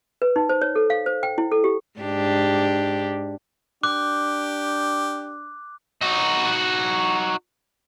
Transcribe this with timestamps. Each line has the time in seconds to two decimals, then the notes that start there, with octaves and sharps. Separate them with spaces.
0.22 B4
0.36 D#4
0.49 C5
0.62 C#5
0.75 A4
0.90 F5
1.06 C5
1.23 G5
1.38 E4
1.52 A4
1.64 G4
2.00 G#2 D4 G4
3.83 D4 G4 D6 F#6
6.01 D#4 F#4